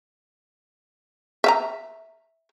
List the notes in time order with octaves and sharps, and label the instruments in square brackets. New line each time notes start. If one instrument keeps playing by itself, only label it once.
[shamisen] E5 F5 A#5